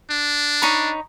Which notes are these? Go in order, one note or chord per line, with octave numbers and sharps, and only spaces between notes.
D4
D#4 C#5 B5